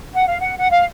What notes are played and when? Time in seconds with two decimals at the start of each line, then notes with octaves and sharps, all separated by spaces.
0.14 F#5
0.26 F5
0.39 F#5
0.58 F#5
0.71 F5